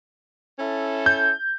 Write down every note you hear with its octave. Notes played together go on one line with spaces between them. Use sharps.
C#4 E4 A4
G6